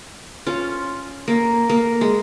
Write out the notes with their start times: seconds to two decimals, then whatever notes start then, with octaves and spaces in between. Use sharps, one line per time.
0.46 C#4 F4
1.28 A#3
1.69 A#3
2.01 G#3